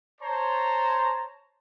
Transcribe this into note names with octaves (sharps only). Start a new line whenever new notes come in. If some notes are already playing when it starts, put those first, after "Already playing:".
C5 C#5 A5 A#5 C6